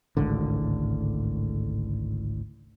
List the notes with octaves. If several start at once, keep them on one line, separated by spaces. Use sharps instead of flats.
G#1 C#2 A2 D3